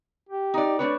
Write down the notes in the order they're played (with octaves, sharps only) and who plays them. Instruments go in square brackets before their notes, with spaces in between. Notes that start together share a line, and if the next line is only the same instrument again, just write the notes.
[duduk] G4
[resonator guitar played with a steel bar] D#4 D5
[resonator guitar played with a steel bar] A3 D4 C#5 [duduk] B4